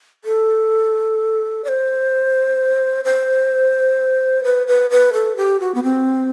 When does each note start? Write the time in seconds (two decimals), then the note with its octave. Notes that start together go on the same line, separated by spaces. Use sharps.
0.24 A4
1.64 D5
1.68 C5
3.05 C5
4.44 B4
4.67 B4
4.90 B4
5.13 A4
5.36 G4
5.60 F#4
5.74 B3
5.83 C4